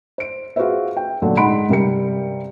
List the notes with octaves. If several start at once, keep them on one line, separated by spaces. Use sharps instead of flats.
C5 D7
F4 F#4 G#4 B4 C5 E5
G5
A#2 D3 F#3
G#2 D#4 F#5 B5 C6 D7
G2 C3 G3 A#4 G5 C#7